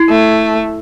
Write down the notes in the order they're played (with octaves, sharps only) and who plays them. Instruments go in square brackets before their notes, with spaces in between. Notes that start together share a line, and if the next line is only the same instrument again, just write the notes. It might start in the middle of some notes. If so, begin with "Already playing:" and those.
Already playing: [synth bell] E4
[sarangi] A3